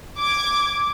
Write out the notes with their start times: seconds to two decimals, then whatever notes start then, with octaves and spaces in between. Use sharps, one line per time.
0.18 D6 G#6